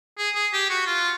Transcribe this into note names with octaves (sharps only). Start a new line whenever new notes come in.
G#4
G#4
G4
F#4
F4